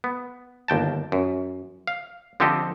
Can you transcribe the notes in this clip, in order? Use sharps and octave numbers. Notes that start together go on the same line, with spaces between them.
B3
G1 D#2 G5 A5
F#2
F5
D3 F3 C4 G4 A4 D#5